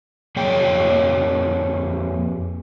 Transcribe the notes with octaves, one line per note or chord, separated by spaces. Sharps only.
F2 A#3 G#4 C#5 G5